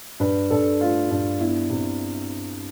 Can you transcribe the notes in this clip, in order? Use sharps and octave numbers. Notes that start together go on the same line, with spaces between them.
G2 B4
G2 A4
A3 F4
G2
B3 E4
C3